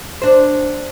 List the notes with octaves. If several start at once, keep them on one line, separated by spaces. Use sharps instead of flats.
D4 C5